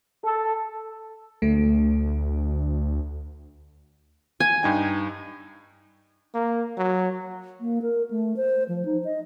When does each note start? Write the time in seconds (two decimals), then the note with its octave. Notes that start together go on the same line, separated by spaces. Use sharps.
0.23 A4
1.42 D2 A3
4.40 G#5
4.63 G2 D#4 G5
6.35 A#3
6.78 F#3
7.61 A#3
7.82 A#4
8.11 A3
8.37 C5
8.69 F3
8.85 D#4
9.04 D#5